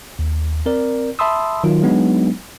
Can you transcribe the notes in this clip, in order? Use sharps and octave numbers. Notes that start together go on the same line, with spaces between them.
D#2
C4 A#4 D5
E5 A5 B5 C6 D#6 E6
D#3 F#3 F4
F#3 G#3 B3 D4 D#4